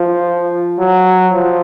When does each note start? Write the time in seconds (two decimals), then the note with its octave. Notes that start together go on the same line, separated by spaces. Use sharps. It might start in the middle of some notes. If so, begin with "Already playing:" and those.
Already playing: F3
0.78 F#3
1.33 F3